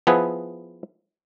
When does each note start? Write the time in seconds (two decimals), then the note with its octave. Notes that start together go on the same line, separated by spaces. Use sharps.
0.07 F3 B3 E4 G#4 B4